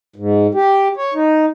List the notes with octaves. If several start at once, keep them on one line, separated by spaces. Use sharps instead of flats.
G#2
G4
C#5
D#4